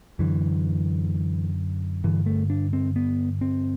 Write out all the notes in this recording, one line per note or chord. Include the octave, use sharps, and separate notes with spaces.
F#2 D3 E3
G2 D3 E3
A3
D4
C4
B3
C4